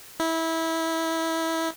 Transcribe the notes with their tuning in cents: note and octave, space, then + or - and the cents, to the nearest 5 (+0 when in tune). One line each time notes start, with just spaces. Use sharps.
E4 -20